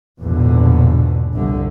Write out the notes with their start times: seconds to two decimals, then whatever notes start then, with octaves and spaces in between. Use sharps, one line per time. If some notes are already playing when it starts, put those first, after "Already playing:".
0.21 A#1 E2 G#2 B2 D3
1.33 G1 C2 D3